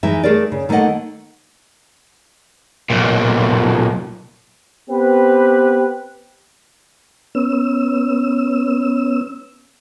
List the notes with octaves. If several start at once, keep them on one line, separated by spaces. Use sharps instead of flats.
E3 G#3 D#4 E5
A3 G#4 A#4 D5
C#3
D#3 A3 A#3 A4 D#5 F#5
B1 A#2
B3 C4 G4 B4
B3 C#4 E6